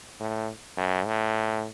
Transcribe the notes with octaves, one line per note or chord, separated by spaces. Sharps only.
A2
F#2
A2